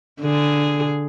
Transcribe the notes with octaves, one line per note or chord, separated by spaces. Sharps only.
D3 G#4